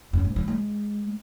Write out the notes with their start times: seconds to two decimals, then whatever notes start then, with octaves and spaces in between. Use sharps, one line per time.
0.13 F#2
0.25 G#2
0.36 E3
0.48 G#3